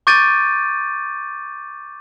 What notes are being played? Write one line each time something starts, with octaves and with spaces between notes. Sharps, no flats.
C#6 D6 G6 A6 D7 D#7